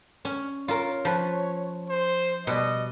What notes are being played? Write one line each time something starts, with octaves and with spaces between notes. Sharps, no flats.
C#4
F4 A#4 C#5
F3 B4
C5
B2 G3 D#5